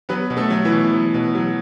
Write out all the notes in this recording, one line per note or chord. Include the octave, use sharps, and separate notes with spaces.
F#3 B3 B4
B2
A3 A4
F#3
E3 E4
B2
F#3
B2
F#3